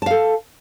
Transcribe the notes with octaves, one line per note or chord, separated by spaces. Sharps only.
A4 F5 A5